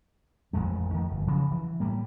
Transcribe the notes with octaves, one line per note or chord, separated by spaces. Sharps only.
A1 F2 G#3 A3
D#3 F3 A3
G1
C#3 F3 F#3
E3
A2 G3 A#3